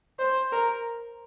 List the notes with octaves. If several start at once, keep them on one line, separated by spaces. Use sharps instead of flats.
C5
A#4